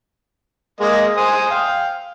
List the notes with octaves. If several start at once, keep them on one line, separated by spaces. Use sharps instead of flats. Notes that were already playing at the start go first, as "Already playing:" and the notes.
G#3 A#3 D#5
C5 G#5 D#6
F5 G5